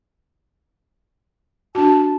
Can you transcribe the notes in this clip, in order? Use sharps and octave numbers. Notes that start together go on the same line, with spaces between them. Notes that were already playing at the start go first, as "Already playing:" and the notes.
D4 F#4 A5